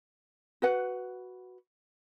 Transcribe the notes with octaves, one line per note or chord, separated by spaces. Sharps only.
F#4 B4 F#5